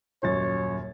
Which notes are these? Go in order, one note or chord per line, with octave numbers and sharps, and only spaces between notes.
D#1 F#2 C#5 A6